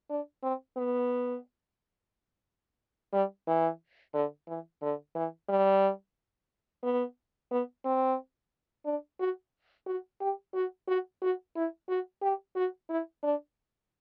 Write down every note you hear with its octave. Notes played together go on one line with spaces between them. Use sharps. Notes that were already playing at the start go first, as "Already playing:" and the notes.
D4
C4
B3
G3
E3
D3
E3
D3
E3
G3
B3
B3
C4
D4
F#4
F#4
G4
F#4
F#4
F#4
E4
F#4
G4
F#4
E4
D4